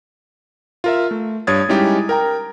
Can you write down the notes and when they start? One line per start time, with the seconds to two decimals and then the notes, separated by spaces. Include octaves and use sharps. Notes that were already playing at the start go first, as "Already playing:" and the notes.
0.84 F4 A#4 E5
1.11 A3
1.47 G2 C#5 D#6 G#6 A6
1.69 G3 G#3 C#4 D#4 E4 G4
2.09 A#4 G5 A#5